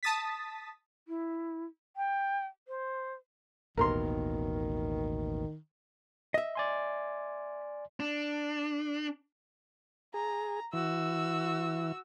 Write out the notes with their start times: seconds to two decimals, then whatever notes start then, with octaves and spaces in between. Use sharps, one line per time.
0.03 A5 D#6 A6 B6
1.08 E4
1.96 G5
2.68 C5
3.77 A1 D#2 B2 D#3 A#4 A#5 C6
6.34 D#5 E5
6.55 D5 G#5 C6
8.00 D4
10.14 G#4 A#5
10.73 E3 F#4 E6